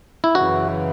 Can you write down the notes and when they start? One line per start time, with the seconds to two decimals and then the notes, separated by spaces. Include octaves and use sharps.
0.24 E4
0.35 F#2 C#3 E3 F#4